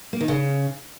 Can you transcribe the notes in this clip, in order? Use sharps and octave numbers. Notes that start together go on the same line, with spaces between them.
A#3
D#3
C#3